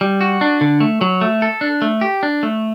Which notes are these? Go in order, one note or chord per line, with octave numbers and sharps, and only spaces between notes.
G3
F#4
D4
D3
A3
F#3
A3
A4
D4
A3
G4
D4
A3